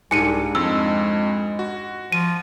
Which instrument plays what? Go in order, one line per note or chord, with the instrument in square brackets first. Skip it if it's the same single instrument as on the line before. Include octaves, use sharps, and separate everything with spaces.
[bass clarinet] C2 [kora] G#2 D4 G4 [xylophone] G#5 C#7 D#7
[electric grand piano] F2 [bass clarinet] G#3 [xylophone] E6
[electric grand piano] F#4
[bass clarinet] F3 [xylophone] D#7